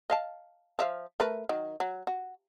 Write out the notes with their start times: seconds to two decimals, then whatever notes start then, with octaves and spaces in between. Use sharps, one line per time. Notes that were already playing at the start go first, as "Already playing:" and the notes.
0.10 D#5 F5 A5
0.79 F3 E5 F5
1.20 A3 A#4 B4
1.49 D#3 F#3
1.80 F#3
2.07 F#4